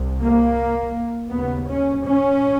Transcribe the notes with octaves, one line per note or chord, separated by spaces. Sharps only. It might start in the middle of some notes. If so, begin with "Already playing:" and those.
Already playing: C2 C3
A#3
D#2 C#3 B3
C#4
C#4